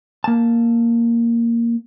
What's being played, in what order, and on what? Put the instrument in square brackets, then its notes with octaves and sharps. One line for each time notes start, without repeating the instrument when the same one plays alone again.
[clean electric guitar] A#3 A5